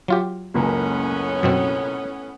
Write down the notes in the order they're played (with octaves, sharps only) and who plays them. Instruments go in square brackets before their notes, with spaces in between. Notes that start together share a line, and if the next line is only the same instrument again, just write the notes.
[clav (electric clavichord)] F#3 F4 G4
[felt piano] F#1 C#2 A#3 [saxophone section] A2 B3 C#4
[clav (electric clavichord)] F#2 B2 C4